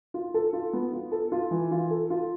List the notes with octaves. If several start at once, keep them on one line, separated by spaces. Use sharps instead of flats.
F4
A4
F4
B3
F4
A4
F4
E3
F4
A4
F4